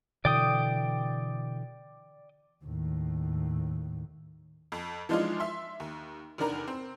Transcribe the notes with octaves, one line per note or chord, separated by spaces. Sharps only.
B2 D3 E3 D5 G5 D#6
D#2 A2
F2
E3 F3 G#3 D4 D#4 F4
E5 C6
D#2
F1 E2 D#3 D4 A#4 A#5
C4